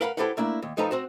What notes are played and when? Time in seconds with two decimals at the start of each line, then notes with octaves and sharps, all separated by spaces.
0.01 A#4 B4 F5 F#5 A#5 B5
0.17 E4 G4 A4 B4 C5 F#5
0.37 A3 A#3 D4 E4
0.62 D#2
0.77 F2 F3 D#4 A4 B4 A#5
0.91 C4 F#4 C5